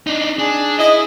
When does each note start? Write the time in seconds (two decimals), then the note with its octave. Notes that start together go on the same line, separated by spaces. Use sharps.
0.07 D4 D#4
0.39 D4 G#4
0.79 E4 D#5